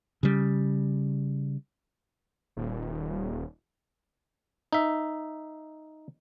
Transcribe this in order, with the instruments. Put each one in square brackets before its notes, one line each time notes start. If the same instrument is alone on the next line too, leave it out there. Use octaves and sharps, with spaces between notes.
[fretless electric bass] C#3 G3
[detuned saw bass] D#1
[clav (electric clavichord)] D#4 E5